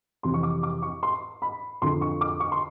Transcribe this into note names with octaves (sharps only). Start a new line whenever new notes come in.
F2 C3 E3 C6
C#6
D6
D6
C#6
C6
B5
F2 D3 F3 C6
C#6
D6
C#6
C6